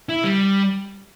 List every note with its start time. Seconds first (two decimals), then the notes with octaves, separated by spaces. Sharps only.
0.09 E4
0.24 G3